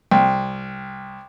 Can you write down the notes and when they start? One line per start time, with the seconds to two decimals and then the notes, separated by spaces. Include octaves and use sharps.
0.11 C2